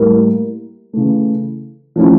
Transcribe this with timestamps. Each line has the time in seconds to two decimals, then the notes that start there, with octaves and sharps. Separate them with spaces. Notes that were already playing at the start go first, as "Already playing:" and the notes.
Already playing: A2 G3 A#3 E4 A#4
0.93 C#3 E3 A3
1.96 F3 A3 C#4 E4